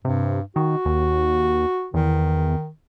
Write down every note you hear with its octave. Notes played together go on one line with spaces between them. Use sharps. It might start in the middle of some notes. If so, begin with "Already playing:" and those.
G2 C3
D#3 F#4
D#2
E2 D#3